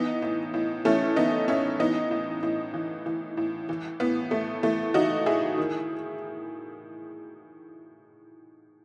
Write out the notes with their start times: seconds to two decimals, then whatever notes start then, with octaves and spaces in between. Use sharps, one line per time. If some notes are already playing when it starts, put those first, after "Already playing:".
Already playing: E3 B3 D#4
0.22 A2
0.54 A2
0.85 E3 A3 C#4
1.16 E3 B3 D#4
1.48 A2 C#4 E4
1.80 E3 B3 D#4
2.11 A2
2.43 A2
2.74 E3
3.06 E3
3.37 A2
3.69 E3
4.00 A2 B3
4.31 A2 A3
4.63 E3 A3
4.94 E3 D#4 F#4
5.26 A2 E4 G#4
5.58 D#3